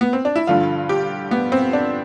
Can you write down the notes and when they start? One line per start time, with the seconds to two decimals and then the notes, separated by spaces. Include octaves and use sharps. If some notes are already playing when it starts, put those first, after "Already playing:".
0.01 B3
0.13 C4
0.25 D4
0.36 E4
0.47 G2 D3 F3 F4
0.89 G4
1.31 B3
1.52 C4
1.73 D4